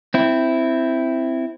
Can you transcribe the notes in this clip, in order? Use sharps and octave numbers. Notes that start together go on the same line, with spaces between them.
C4 E4